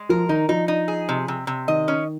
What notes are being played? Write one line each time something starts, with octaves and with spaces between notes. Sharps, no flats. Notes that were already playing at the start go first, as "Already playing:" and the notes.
Already playing: G#3
F3 A#4
D#3 D#4
F3 D#4
D#4
G#4
C3
C3
C3
D#3 D#5
C#4